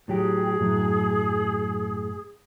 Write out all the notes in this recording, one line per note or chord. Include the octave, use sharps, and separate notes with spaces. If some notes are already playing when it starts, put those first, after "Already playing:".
A2 F#3 G4 G#4
F#2 A2 F#3